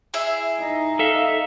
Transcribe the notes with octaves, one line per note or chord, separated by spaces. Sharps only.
E4 G#4 E5
D#4 D#5
A4 E5 F5